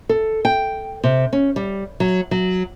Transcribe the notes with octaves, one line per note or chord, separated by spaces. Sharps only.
A4
G5
C3
C#4
G3
F#3
F#3